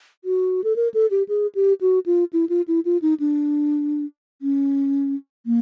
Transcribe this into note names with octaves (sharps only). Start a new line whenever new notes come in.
F#4
A4
A#4
A4
G4
G#4
G4
F#4
F4
E4
F4
E4
F4
D#4
D4
C#4
A#3